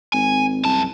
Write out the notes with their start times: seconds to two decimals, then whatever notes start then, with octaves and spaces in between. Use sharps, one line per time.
0.14 G#1 G#5
0.65 C2 F#2 A5